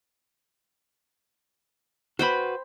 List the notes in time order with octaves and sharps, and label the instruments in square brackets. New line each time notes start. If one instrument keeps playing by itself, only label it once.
[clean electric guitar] F#4 B4 [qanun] C5 G5 B5